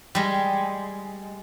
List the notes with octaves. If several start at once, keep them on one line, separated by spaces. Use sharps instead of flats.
G3 G#3